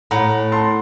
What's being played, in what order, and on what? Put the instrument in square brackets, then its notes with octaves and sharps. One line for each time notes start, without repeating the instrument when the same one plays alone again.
[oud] A2 [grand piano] F#5 A#5
[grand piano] A5 C6